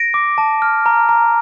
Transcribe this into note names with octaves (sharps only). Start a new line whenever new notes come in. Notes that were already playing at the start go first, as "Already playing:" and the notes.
Already playing: A#6 D7
D6
A5
F6
A#5
A#5